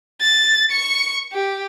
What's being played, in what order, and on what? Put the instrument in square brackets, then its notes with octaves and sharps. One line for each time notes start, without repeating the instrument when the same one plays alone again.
[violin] A6
C#6 C#7
G4